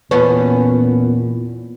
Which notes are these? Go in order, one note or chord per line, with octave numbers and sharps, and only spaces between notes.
E2 A#2 B3 C#4